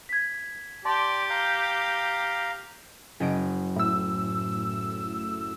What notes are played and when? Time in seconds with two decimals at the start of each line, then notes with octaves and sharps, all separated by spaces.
0.09 G#6 B6
0.85 G4 D5 A5 C6
1.30 F5 A#5 G6
3.20 F#1 D#5 D7
3.76 A2 E6